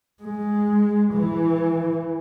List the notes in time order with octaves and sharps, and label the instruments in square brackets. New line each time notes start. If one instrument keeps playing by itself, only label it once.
[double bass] G#3
E3